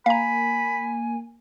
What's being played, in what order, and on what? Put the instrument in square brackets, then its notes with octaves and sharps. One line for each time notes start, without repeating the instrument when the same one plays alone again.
[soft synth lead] A#3 [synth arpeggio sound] F5 A#5 [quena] G#5 [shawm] B5